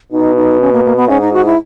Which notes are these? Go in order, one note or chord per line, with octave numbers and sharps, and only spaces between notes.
B2 D#4
D#4
C#4
A#3
A#3
B3
G#2 C#4
D#4
F#4
E4